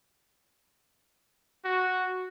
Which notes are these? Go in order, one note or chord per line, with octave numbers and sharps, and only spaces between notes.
F#4